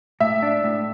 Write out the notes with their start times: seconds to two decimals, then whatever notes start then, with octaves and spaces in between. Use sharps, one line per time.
0.20 A2 E5
0.43 D4
0.64 A2